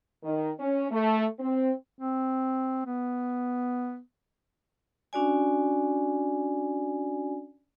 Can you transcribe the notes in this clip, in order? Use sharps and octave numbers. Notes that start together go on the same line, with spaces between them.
D#3
C#4
A3
C4
C4
B3
C#4 D4 F#4 D5 G#5